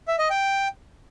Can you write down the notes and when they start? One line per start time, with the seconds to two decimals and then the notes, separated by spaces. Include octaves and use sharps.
0.08 E5
0.19 D#5
0.30 G5